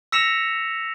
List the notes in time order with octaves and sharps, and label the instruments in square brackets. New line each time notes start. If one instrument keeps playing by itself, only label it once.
[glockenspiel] E6 A#6 B6 C#7 E7 F7